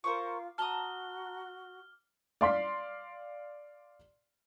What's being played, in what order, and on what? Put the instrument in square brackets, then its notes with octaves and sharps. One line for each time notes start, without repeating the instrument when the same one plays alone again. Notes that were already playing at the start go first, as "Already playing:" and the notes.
[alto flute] F4 [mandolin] A#4 C5 C#6 [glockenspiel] D6
[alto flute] F#4 [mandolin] A5 A#5 D#6 [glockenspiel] F6 G7
[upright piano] D5 F5 C6 B6